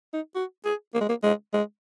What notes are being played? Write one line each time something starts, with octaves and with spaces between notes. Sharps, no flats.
D#4
F#4
G#4
A#3
G#3
A#3
G#3
G#3